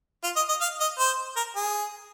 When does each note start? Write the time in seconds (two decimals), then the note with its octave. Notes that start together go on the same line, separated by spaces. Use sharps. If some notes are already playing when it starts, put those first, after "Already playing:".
0.24 F4
0.36 D#5
0.49 D#5
0.61 F5
0.80 D#5
0.99 C5
1.36 A#4
1.56 G#4